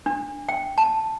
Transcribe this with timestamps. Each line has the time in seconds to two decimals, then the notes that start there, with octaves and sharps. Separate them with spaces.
0.06 D4
0.49 G5
0.78 A5